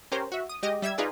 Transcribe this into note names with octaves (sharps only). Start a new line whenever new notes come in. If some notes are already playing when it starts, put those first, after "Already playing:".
C#4 G4 A#4 C5
F#4 E5
D#6
G#3 G4 D#5
G3 E5 E6 G#6
D#4 F4 G#4 B4 D5